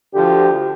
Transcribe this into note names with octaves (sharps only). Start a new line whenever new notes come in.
D2 D3 F3 G4